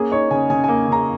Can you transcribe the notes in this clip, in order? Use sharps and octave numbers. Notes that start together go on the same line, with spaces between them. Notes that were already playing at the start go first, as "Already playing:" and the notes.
Already playing: A#3 C#4 G#4
D#4 C#5
C#3 G#5
C#3 G#5
A#3 G#5
C#3 A#5